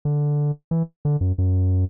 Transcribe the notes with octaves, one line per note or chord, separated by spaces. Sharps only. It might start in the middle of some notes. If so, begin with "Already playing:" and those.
D3
E3
D3
F#2
F#2